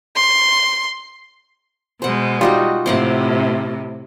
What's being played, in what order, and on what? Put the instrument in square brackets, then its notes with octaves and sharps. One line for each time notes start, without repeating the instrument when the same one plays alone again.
[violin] C6
[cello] B2 G#3 [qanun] C5 F#5
[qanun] G3 D#4 F#4 [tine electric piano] F4
[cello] A2 C3 [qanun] C5 F5 F#5